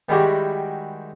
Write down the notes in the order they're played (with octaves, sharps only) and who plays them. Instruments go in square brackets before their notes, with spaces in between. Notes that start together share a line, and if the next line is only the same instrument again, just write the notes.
[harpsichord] D#3 G3 G#3 E4 F#4 G4